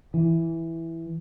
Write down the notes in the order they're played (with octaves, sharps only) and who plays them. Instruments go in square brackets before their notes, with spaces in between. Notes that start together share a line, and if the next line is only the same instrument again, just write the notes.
[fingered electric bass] E3